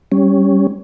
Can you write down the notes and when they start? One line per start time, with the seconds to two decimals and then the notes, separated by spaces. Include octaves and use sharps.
0.12 G3 C#4